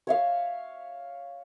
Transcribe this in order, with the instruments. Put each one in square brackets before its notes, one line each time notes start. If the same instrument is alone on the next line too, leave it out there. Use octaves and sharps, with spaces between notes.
[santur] C#5 E5 F5